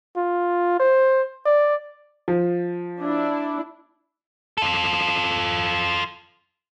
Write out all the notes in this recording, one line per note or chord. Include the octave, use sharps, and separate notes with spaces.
F4
C5
D5
F3
D4 E4
F4 A4